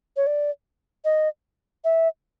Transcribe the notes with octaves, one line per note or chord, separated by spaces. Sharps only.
C#5
D5
D#5
E5